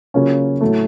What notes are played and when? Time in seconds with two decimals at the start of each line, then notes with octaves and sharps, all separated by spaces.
0.14 C#3 F#3 A#3 C#4 F4
0.61 A2 F#3 A3